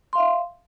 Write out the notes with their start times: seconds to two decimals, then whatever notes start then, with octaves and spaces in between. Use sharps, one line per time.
0.13 C6
0.15 F5
0.18 E5